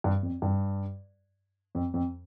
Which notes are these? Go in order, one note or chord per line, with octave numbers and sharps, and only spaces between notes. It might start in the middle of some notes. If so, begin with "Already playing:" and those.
G2
F2
G2
F2
F2